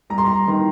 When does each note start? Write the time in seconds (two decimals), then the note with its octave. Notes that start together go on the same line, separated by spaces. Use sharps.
0.10 G3 A#5
0.18 C6
0.26 A#5
0.48 D#3 C6